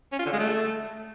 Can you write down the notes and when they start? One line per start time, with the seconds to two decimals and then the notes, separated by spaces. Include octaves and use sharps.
0.12 C#4
0.19 F4
0.26 D3
0.33 G#3
0.39 A3